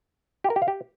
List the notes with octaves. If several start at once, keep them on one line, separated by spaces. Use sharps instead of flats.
G4
A#4
G4
F5
G4